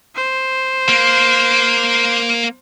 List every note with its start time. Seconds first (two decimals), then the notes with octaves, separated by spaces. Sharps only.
0.15 C5
0.89 A#3